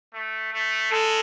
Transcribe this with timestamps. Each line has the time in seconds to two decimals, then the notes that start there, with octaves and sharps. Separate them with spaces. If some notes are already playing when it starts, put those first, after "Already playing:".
0.14 A3
0.53 A3
0.91 G#3 A4